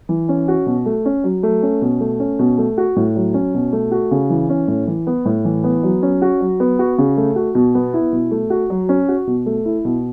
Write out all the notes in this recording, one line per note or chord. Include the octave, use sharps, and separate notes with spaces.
E3
C#4
F#4
B2
A3
C#4
F#3
A3
C#4
B2
A3
C#4
B2
A3
F#4
A2
F#3
C#4
B2
A3
F#4
C#3
E3
C#4
A2
E3
B3
A2
E3
B3
F#3
C#4
F#4
F#3
B3
F#4
C#3
A3
F#4
B2
B3
E4
B2
A3
F#4
F#3
C#4
F#4
B2
A3
E4
B2